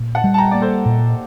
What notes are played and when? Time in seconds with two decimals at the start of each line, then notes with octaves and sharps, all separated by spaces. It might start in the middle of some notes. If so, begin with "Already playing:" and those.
Already playing: A#2
0.15 F#5 A5
0.24 G3
0.34 A5
0.38 G5 A#5
0.51 A#3 D5
0.61 A4 C5
0.85 A#2